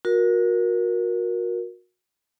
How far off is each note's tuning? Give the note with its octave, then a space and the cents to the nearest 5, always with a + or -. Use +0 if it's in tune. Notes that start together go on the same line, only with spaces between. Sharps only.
F#4 -30 A#4 +15